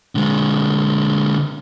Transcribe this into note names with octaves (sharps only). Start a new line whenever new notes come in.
D3 G#3